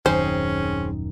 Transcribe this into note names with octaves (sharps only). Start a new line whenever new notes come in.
D#1 F#2 D#3 C4 C#4 G#4 C5